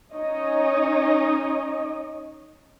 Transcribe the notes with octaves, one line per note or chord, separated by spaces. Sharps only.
C#4 D#4 C#5 D#5